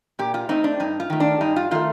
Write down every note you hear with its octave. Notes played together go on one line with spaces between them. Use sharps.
A#2 G4
F4
A3 C4 D#4
D4
G2 D#4
F4
D#3 A3
D4
G2 D#4
F4
D#3 A3 F4